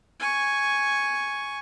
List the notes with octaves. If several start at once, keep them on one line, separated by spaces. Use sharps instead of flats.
G#5 C#6